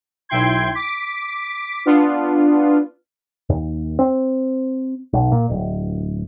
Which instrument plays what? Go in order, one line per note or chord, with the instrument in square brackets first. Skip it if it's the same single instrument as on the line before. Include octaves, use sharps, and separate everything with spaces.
[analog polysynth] B1 E4 G5 C6 G#6
D6 B6
B3 D4 F4
[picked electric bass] D#2
C4
B1
A#2
D1